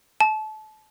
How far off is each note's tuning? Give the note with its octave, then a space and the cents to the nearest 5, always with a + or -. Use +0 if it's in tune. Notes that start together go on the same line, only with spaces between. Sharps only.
A5 -30